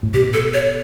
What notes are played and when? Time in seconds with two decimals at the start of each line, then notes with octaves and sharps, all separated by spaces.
0.03 A2
0.14 B2 G4
0.33 A4
0.54 C#5